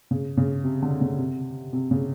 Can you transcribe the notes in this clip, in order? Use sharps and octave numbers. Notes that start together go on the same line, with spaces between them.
C#3
C#3
C3
D3
C#3
C3
C3
C#3